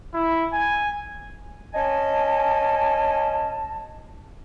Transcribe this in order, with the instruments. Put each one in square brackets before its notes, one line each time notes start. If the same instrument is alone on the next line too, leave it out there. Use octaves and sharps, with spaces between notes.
[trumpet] E4
G#5
[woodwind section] C#4 D#5 G#5 A5